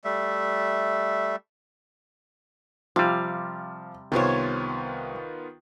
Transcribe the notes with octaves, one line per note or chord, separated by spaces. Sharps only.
G3 A3 E5
C3 F3 G3 F5
C2 D#3 B3 F4 C5 C#5